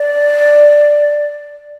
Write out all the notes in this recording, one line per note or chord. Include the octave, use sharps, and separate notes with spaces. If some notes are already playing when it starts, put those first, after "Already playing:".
Already playing: D5